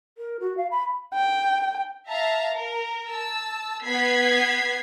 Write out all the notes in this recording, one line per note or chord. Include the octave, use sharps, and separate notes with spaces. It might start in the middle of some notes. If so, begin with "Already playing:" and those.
A#4
F#4
F5
B5
G5
E5 F5 A5 A#5
A#4
A5 E6
B3 G#6 B6 C7